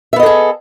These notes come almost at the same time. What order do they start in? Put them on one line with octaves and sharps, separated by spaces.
E5 B3 D#5 A4 G#4